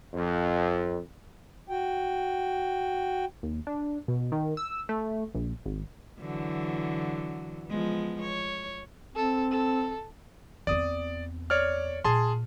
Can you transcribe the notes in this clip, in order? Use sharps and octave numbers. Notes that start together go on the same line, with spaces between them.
F2
F#4 G5
D#2
D4
B2
D#3
E6
A3
A#1
G#1
D3 E3 F#3
F3 G#3 B3
C#5
C4 A4
A4
E2 C4 D5 D#6
C#5 D5 F6
A#2 G#4 A5 C6